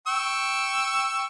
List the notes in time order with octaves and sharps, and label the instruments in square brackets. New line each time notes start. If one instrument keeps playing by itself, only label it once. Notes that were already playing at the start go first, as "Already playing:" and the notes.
[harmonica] G5 C#6 E6